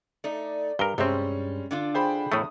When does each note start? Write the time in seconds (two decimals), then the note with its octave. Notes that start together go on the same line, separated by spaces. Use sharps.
0.24 A3 D#4 D5
0.79 G2 A#4 A#5 G7
0.98 G2 C3 G3 G#3 C4 C#4
1.71 D3 D4 F4
1.94 G#4 C5 G5 B5
2.32 E2 A2 A3 D#6